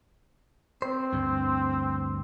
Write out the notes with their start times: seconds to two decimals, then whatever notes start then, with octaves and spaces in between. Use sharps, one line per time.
0.82 C4 C5
1.13 D2 G2